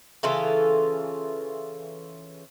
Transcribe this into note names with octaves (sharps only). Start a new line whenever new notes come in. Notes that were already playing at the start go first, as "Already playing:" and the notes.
C#3 E3 F4 A4